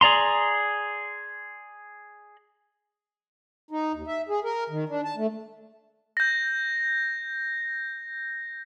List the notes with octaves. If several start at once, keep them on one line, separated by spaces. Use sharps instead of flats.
G#4 D5 A#5 C6
D#4
D#2
E5
G#4
A#4
D#3
D4
A5
A3
G6 A#6